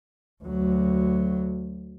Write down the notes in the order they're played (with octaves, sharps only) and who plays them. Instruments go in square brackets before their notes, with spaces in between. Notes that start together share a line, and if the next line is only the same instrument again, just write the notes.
[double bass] D2 F#3